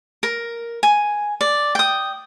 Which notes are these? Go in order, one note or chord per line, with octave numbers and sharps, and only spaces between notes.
A#4
G#5
D5
G5 D#6